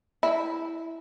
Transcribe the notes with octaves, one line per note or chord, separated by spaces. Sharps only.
E4